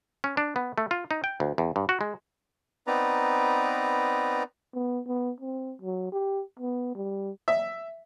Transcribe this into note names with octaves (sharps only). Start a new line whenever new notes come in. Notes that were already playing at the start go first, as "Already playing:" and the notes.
C#4
D4
B3
A3
F4
D#4
G5
D2
E2
G2
F#4
G#3
B3 C4 D#4 B4 D5 A#5
B3
B3
C4
F#3
G4
B3
G3
E5